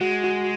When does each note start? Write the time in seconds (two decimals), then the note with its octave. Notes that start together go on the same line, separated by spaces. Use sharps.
0.01 G#3 F#4
0.24 F#4